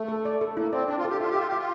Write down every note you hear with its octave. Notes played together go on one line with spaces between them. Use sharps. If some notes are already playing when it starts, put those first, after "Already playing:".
Already playing: A3
A4
D5
A4
A#3 E4
C4 D5
D4 D5
F4
A4
G4
F4 E5
G4
F4 E5
G4 E5
F4